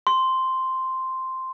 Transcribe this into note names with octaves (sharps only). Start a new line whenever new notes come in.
C6